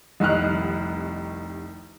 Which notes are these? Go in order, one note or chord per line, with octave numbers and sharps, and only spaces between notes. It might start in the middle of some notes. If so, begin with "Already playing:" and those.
F1 C2 D#3 D#5 F6 F#6